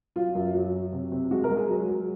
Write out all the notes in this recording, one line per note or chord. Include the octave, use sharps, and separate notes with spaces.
F#3 F4
F#2
F#3
F#3
C3
C3
G#3 F#4
A#4
G#3
G#4
F#3
F#3